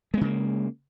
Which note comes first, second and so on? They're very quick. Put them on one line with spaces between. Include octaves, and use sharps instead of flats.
G#3 B3 C#3 A#3